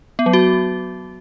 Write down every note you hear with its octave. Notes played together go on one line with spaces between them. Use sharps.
B3
F#3
F#4